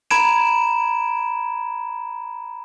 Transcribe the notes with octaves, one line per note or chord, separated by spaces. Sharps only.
A#5 B5 G#6 D7 E7